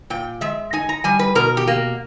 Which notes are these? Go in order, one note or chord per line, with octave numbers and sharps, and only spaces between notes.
A#2 G5
G#3 E5
D#4 G#5
A#5
G3 G#5
B4
B2 A#4
G4
A#3